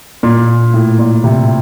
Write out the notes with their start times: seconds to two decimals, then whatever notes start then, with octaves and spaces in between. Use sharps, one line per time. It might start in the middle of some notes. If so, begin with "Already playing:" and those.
0.23 A#2
0.74 A2
0.99 A#2
1.24 C3